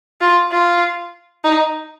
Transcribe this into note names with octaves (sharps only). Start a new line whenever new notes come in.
F4
F4
D#4